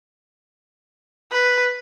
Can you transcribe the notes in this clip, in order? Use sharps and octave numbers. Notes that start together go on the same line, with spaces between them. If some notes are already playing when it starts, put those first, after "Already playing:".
B4